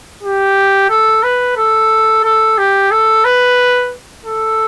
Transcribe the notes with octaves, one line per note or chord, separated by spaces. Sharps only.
G4
A4
B4
A4
A4
G4
A4
B4
A4